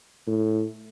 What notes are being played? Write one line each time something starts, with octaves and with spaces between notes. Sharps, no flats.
A2